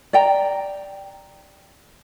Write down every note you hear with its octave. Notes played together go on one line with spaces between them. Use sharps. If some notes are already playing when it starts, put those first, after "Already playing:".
D5 G5 A#5